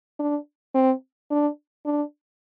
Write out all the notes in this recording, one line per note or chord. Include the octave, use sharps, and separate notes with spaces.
D4
C4
D4
D4